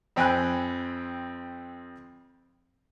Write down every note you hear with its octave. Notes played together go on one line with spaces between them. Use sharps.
F2 C4 G5 G#5 B5 F#6